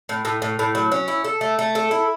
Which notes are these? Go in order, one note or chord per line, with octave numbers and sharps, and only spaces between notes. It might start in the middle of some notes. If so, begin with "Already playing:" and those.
A2
A2
A2
A2
F#3
C#4
E4
A4
A3
A3
A4
E4